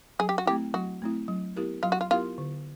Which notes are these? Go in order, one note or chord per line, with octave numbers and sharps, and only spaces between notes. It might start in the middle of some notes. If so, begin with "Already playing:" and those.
F#3 G#4
G4
F#4
A3 C4 E4 G4
F#3 F#4
A3 C4 E4
F#3
B3 E4 G4 A#4
F#3 F4
F#4
F4
B3 E4 F4 G4 A#4
D3